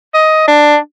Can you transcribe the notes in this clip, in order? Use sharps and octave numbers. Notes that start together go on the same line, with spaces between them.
D#5
D4